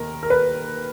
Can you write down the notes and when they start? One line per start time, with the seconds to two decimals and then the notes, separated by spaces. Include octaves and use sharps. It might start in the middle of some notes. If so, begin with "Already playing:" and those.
Already playing: D#2 D#3 A#4
0.23 A#4
0.30 B4